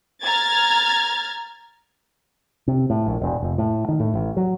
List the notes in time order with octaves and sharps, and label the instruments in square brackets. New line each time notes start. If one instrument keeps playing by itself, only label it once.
[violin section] A#5 F6 G#6 A6
[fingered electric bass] C3
A2
A#1
E1
F1
A2
D#3
A2
A1
F#3